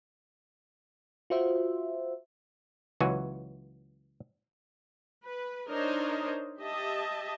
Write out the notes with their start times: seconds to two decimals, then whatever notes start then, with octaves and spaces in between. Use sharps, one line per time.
1.30 F4 F#4 C5 E5
3.00 C#2 E3 F#3 F#4 G#5
5.24 B4
5.69 D4 D#4 A#4 C5 C#5 D#5
6.60 G4 D#5 E5 A5